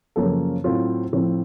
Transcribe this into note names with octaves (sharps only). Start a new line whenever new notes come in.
F#2 C#3 F3 A#3 C#4 A4
A2 F#3 C4 F4
A2 F3 C4